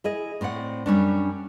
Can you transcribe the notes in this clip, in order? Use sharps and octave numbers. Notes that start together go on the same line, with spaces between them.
E4 G#4 D#5
A2 C4 D5 F#5
F#2 G3 C#4 D4